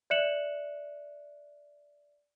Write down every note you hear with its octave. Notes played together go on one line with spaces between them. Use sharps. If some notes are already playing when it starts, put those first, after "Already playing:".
D5 E5 F#6 C#7 E7 F#7